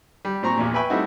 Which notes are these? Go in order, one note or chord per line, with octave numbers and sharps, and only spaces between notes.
G3
A#2 C4 A#5 C#6
A#1 E2 A#2
B4 E5 G5 G#5 B5 C#6
G3 A3 C4 D#4 E4 F#4